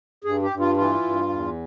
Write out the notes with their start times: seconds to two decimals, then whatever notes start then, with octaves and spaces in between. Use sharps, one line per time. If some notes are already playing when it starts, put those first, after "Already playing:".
0.24 G2 G#4
0.42 G4
0.51 G2
0.60 F4
0.77 E3 F4
1.03 G2
1.29 E2